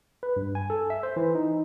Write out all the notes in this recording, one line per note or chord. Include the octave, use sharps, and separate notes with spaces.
B4
G2
G#5
A4
E5
C5
E3
D#4